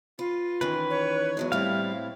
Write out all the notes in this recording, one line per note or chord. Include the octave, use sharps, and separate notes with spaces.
F4 B4
D#3 E3 C#4 B4
C#5
E2 F#3 G#3
A2 G3 C4 E4 F5